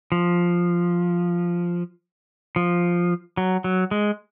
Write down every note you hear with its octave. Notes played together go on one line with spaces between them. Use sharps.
F3
F3
F#3
F#3
G#3